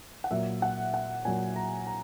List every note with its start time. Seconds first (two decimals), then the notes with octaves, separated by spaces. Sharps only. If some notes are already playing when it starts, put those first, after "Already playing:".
0.24 F#5
0.31 A#2 F#3 E5
0.62 F#5
0.94 F#5
1.25 A#2 F#3 G#5
1.56 A#5
1.87 A#5